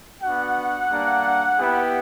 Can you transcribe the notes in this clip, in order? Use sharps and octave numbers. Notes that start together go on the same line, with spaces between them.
B3 D4 F#4 F#5
G3 A#3 D4
B3 E4 G4